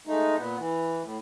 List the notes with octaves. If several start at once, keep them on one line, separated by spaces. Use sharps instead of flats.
G#3 A3 D#4
A#2 B3
E3
A2